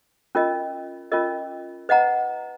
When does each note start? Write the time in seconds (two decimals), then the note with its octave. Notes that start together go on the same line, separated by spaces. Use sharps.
0.35 C#4 F4 A#4 D#5
1.12 C#4 F4 A#4 D#5
1.89 B4 D#5 F#5 A#5